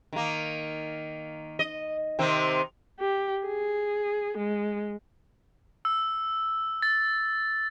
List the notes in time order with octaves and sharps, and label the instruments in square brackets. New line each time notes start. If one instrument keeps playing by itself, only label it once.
[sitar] D#3 A#3
D#5
C3 D#3 C4
[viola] G4
G#4
G#3
[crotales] E6
A6